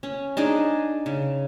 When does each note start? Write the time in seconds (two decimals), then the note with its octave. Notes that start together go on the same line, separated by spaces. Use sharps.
0.03 C#4
0.37 D4 D#4 G#4
1.06 C#3